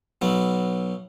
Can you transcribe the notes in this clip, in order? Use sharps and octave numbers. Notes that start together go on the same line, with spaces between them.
B1 B2 F#3 B3